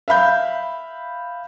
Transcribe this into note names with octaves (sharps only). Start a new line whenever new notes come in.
E5 F5 B5 G6